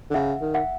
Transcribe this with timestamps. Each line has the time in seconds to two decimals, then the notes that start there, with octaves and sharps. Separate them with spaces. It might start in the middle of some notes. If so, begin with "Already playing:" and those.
0.11 D3
0.14 C#3 E5 F#5
0.41 D#3
0.54 E5 F#5